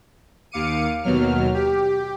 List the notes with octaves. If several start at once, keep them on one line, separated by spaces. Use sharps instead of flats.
D#2 F5 D6 C#7 D#7
D#2 B2 F#3 F6
G4